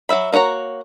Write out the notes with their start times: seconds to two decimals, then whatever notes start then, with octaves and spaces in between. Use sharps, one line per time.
0.09 F#3 D4 E5 B5
0.32 A#3 D#4 F#4 C#5 A#5